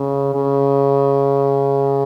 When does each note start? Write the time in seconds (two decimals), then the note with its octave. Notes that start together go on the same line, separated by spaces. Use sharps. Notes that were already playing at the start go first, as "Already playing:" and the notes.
Already playing: C#3
0.34 C#3